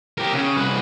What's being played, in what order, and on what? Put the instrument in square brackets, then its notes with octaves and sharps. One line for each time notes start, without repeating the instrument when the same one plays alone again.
[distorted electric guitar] G4 A#4
C#3
C2 B4